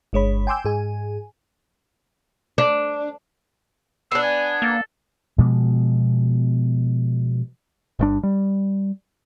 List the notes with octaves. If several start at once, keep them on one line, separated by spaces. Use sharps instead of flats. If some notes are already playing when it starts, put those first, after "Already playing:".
G1 G#3 C#5 B5
G5 G#5 C6 D6 E6 G6
G#2 G#4 G#5
D4
B3 D4 E6 C7
G#5 G#6
A#3 A4
B2 F3 G#3 B3
G1 G2 D4
G3